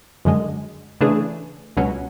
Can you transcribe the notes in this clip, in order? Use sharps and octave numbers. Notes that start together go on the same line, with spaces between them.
F#2 D3 G#3
C#3 E3 A3 D4 G#4
C#2 B2 F#3 C#4